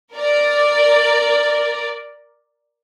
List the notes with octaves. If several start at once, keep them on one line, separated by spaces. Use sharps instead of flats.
A#4 D5